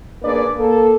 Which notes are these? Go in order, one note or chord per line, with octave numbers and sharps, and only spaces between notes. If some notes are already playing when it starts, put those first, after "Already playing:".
A#3 D4 G#4 B4 D5
A#3 A4